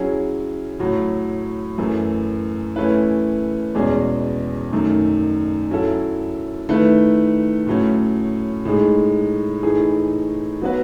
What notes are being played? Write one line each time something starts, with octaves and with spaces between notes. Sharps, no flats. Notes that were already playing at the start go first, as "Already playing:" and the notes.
Already playing: F#3 C#4 E4 G#4
A2 F#3 A3
F#2 E3 A3
E3 A3 C#4 E4 B4
E2 B2 G#3 C#4 G#4
F#2 D#3 A3
F#3 C#4 E4 A4
D#3 A3 E4 B4
A2 F#3 A3 C#4
A2 G#3 D#4 G#4
A2 E3 A3 D#4 G#4
F#3 B3 F#4 B4